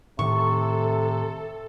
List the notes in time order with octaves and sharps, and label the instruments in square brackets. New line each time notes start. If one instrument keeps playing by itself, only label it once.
[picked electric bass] A2 D#3 [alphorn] C3 [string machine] A4 [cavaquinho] C#6